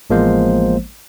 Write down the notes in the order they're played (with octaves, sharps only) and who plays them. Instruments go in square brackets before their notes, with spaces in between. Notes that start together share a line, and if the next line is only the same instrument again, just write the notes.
[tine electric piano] A1 F3 G#3 A#3 B3 C5